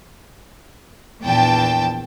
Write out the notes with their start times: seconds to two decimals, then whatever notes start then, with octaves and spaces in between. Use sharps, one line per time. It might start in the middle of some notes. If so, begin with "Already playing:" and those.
1.24 A#1 E2 G5 A5